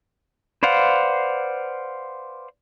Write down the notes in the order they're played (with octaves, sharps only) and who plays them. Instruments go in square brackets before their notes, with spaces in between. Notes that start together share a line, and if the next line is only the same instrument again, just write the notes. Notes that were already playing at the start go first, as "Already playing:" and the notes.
[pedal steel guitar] B4 C5 D5 F5 F#5